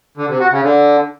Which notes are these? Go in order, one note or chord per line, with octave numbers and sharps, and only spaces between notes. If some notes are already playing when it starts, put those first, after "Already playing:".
D3
C3
F#4
C#3
D3